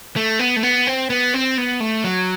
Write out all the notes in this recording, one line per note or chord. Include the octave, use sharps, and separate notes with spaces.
A3
B3
A3
B3
C4
B3
C4
B3
A3
F#3